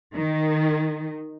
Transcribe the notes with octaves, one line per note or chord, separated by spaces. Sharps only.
D#3